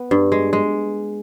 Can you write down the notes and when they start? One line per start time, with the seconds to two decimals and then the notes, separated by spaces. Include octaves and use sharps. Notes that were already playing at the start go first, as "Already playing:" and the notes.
Already playing: B3
0.11 G2
0.32 G#3
0.53 G#3